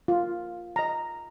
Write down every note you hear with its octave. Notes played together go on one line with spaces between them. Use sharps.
F4
D#5 A#5